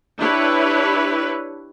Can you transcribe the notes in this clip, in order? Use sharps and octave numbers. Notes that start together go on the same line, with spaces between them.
D4 E4 G4 B4 C#5